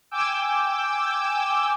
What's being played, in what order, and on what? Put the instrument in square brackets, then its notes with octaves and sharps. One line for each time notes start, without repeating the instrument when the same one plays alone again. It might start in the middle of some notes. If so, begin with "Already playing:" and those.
[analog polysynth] G5 G#5 D6 E6 G6